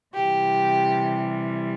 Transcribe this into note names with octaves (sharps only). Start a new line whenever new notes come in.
C3 E3 G3 G4